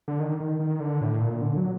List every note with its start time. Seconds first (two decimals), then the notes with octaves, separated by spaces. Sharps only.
0.08 D3
0.20 D#3
0.40 D#3
0.59 D#3
0.80 D3
1.01 A2
1.21 A#2
1.42 D3
1.57 F#3